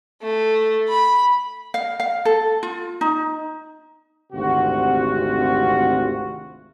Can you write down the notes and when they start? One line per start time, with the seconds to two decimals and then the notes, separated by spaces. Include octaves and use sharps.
0.22 A3
0.89 B5
1.74 F5
2.00 F5
2.25 A4
2.63 F4
3.01 D#4
4.33 G#1 D2 C3 F4 F#4